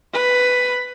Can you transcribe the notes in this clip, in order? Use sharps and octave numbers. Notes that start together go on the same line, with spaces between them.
B4